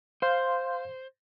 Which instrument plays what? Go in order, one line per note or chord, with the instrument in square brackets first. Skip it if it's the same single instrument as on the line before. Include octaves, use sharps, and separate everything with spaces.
[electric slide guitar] C5 [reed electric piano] F5 C6 G6